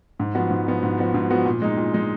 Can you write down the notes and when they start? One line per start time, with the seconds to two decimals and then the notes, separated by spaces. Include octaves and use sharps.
0.20 G#2
0.35 F3 B3 F#4
0.51 G#2
0.67 F3 B3 F#4
0.83 G#2
0.98 F3 B3 F#4
1.14 G#2
1.30 F3 B3 F#4
1.46 A#2
1.62 G#3 D#4
1.77 A#2
1.94 G#3 D#4